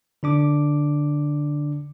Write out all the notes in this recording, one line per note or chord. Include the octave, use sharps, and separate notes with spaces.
D3 D4 D6